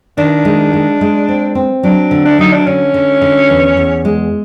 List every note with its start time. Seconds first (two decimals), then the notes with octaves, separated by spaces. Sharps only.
0.18 D#3 D4
0.45 G#3
0.74 G#3
1.01 G#3
1.29 C4
1.55 C4
1.83 F#3 D4
2.11 D3
2.25 D4
2.39 F#3 D#4
2.53 D4
2.67 D3 C#4
2.94 D3
3.22 D3
3.50 E2
3.77 E2
4.05 G#3